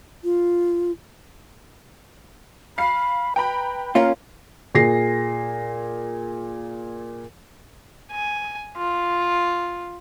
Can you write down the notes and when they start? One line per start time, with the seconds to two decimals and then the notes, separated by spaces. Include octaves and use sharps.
0.24 F4
2.78 F5 B5 C7
3.36 B4 G5 A#5 B5
3.95 A#3 C#4 F4 A#4
4.75 A#2 G#4 A#6 C7
8.12 G#5
8.77 F4